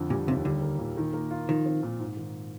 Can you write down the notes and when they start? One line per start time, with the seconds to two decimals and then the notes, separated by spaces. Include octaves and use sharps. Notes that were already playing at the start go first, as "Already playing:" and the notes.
Already playing: F2 D3
0.10 A#2 G3
0.27 D#2 C3
0.45 D3 G3
0.62 A#3
0.79 A#2
0.97 D#3
1.14 A#3
1.31 F4
1.49 D#3 F3
1.66 C4
1.83 A#2
1.99 G#2
2.17 D#3